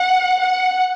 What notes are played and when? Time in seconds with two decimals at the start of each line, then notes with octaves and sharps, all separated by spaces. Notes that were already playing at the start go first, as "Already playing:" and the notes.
Already playing: F#5
0.40 F#5